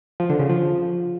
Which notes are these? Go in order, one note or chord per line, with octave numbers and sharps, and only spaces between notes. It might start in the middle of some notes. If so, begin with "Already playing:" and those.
F3
D3
C#3
F3